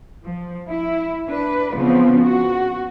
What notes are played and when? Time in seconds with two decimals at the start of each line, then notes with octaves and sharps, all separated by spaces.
0.24 F3
0.70 E4
1.27 D4 B4
1.74 C#3 F3 B3 C4
2.22 F#4